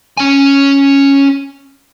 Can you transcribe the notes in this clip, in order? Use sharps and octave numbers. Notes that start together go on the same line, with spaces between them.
C#4 G#5